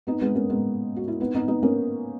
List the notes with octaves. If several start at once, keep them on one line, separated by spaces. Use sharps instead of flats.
B3 D#4
G#3 B3
A#3 C#4
G#3 B3
F#4
E4
B3 D#4
B3 D#4
B3 D#4
A#3 C#4